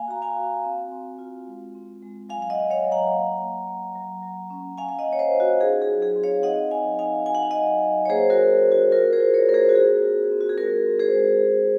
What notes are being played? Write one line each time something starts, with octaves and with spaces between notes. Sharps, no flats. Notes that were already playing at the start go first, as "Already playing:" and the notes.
Already playing: A#3 F5 G#5
F#4 A#5
F5 G#5
F#4
C4
C4
F4
G#3
C4
G#3
F#3 F5 G#5
F5
D#5 F#5
F#3
C#5 F5
F#3
F#5 A#5
A#3
A#3
A#3
F#3
F#3
C#4
C#4 F5 G#5
F5
D#5 F#5
A#3
C#5
C5 D#5
F4
F#4
D#4 G#4
G#4
F#3
G#4
C4
C#5 F5
D#4 D#5 F#5
F#3 F5 G#5
D#4 F5 G#5
F#4 G#5
F#5
F5
F#3 D#5 F#5
F#3
C#5
A#3 G#4 C5
F#4 A#4
A#3
C#4
F#4
F4 F#4 A#4
G#4 C5
F4
A#4 C#5
A#3 A#4
G#4 C5
F#4
C4 G#4
F4
C4
F#4
G#4
G#3 F#4 A#4
C4
G#4 C5
G#3
G#3